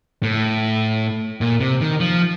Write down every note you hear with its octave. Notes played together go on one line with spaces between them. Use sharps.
A2
A#2
C3
D#3
F3